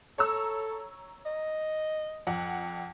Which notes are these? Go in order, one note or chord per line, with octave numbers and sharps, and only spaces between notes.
A4 C#5 A#5 E6
D#5
F2 F#5